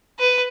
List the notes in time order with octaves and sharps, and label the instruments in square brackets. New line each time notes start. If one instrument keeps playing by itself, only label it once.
[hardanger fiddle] B4